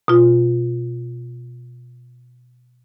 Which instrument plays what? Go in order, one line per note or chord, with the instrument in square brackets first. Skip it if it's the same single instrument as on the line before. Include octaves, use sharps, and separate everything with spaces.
[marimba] B2 F4